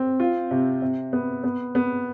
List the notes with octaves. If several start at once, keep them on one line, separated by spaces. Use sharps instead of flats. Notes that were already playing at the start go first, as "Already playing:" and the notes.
Already playing: C4
F4
C3
C3
B3
B3
B3